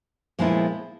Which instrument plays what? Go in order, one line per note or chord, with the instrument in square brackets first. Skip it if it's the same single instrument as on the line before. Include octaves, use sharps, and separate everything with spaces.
[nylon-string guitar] A#2 F3 G#3 B3 E4